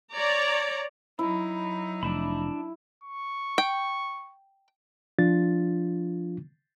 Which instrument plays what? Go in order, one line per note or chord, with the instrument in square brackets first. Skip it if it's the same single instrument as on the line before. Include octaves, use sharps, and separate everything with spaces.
[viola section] C#5 D5 A#5
[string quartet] F#3 D#4 [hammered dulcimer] E4
[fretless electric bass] F1 [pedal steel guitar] D4 E5 B5
[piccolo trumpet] C#6
[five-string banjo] G5
[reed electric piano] F3 D4 F4 A6